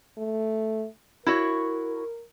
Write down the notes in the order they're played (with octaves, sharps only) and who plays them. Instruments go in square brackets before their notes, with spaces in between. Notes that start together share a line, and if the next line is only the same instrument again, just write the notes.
[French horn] A3
[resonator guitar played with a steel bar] E4 F#4 C#5 [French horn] A#4